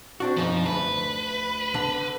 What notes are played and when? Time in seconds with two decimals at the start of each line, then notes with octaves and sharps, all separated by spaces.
0.20 C4 D4 F#4
0.37 B1 F#2 F3 D#4
0.66 D2 B4
1.74 D3